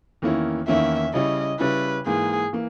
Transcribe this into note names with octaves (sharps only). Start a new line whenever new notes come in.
E2 D#3 A#3 C#4 E4
E2 D#3 A#3 C#4 E4 E5
C#3 G3 C#4 E4 D#5
C#3 G3 C#4 E4 B4
G#2 E3 A#3 G#4
E3 A#3